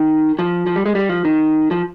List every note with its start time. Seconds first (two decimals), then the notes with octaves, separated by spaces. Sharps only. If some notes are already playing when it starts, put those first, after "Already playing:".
Already playing: D#3
0.39 F3
0.67 F3
0.76 G3
0.86 G#3
0.95 G3
1.09 F3
1.25 D#3
1.71 F3